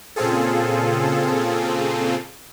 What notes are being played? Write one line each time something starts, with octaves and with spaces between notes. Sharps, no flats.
A#2 C#3 C4 F4 G#4 A4